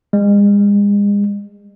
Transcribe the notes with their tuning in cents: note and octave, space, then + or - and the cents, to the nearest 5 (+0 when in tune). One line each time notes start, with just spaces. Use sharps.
G#3 -40